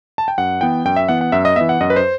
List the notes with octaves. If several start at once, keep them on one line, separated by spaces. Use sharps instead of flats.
A5
G5
F#2 F#5
E3 B3 G5
F#2 G5
E5
E3 B3 F#5
F#5
F#2 E5
D#5
E3 B3 E5
F#5
F#2 D#5
B4
C5